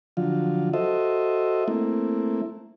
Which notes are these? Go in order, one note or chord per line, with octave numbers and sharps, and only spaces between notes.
D3 F3 F#3 F4
F#4 A4 C5 D#5 E5
A3 A#3 C4 E4